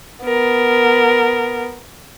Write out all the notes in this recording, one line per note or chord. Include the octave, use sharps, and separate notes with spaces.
B3 A#4